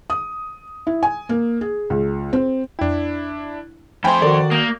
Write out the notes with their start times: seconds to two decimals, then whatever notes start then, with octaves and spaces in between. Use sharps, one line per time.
0.10 D#6
0.87 E4
1.03 G#5
1.29 A#3
1.61 G#4
1.90 C#2
2.33 C4
2.79 F2 D4 E4 G5
4.04 F2 A3 C5 G5 G#5 B5
4.22 D#3 F#4 A4 A#4 D5
4.51 A#3 D#6 G6